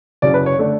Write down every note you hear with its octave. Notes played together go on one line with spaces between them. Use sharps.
F#1 F#2 C#3 F#3 D5
B4
C#5
D3 A3 D4